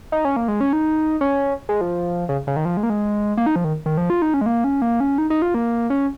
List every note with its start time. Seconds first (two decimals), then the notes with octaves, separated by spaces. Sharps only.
0.12 D#4
0.25 C#4
0.36 A#3
0.48 G#3
0.61 C#4
0.73 D#4
1.21 C#4
1.69 G#3
1.81 F3
2.29 C#3
2.47 C#3
2.56 D#3
2.65 F3
2.77 G#3
2.83 A#3
2.90 G#3
3.37 A#3
3.46 D#4
3.56 F3
3.64 D#3
3.86 D#3
3.97 F3
4.10 F4
4.22 D#4
4.34 C#4
4.41 G#3
4.46 A#3
4.64 C#4
4.82 A#3
5.00 C#4
5.18 D#4
5.30 D#4
5.42 F4
5.54 A#3
5.90 C#4